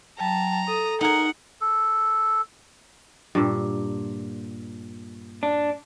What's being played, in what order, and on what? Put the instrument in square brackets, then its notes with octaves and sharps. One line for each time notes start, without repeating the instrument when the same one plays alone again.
[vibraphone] F#3 G5 [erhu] A5 [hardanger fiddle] A#5
[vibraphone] A4 [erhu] D#6
[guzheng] D#4 G#4 [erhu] A#4 [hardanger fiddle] F#5
[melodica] A4
[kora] G2 A#2
[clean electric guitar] D4